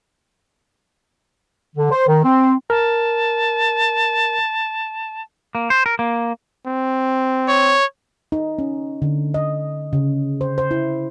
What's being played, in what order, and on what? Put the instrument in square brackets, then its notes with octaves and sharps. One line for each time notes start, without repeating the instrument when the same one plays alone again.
[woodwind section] D3
C5
D#3
C4
[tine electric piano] A#4 [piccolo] A5
[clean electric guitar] A#3
C5
A#4
A#3
[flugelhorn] C4
[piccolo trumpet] C#5
[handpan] D#4
C#4
D3
D#5
C#3
C5
C5
E4